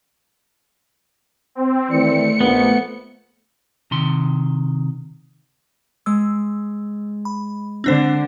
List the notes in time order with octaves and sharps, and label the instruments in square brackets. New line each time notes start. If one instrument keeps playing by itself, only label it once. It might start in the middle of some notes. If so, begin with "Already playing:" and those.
[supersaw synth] C4
[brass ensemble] D#3 E3 D5 [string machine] A3 [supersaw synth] C#7
[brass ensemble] A#1 [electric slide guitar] B3
[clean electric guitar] C3 D#3 C6
[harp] G#3 [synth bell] E6
[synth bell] B5
[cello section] D3 [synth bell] C4 D4 C5